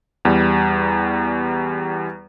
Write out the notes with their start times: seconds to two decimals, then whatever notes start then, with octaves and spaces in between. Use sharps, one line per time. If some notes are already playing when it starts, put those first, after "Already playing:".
0.25 E2 G3 A#5